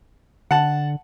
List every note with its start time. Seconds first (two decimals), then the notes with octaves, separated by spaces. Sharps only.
0.51 D3 F#5 A5